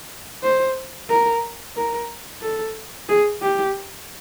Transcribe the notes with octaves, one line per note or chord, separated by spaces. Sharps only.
C5
A#4
A#4
A4
G#4
G4